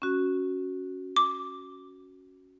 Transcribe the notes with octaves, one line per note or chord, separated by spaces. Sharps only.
C#4 F#4
D6